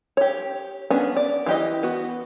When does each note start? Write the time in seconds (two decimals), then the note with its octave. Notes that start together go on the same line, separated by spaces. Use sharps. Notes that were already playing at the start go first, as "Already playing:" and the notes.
0.17 G4 C#5
0.90 B3 C#4 D4
1.16 D5
1.46 E3 G4 D#5
1.83 B3 F#4